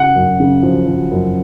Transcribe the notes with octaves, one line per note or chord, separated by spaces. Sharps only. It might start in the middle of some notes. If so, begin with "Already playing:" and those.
Already playing: C#3 F#5
F#2
C#3
F3
F3
F#2